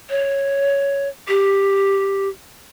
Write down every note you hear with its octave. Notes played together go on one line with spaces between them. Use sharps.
C#5
G4